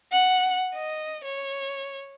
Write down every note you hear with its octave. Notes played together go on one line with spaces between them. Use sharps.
F#5
D#5
C#5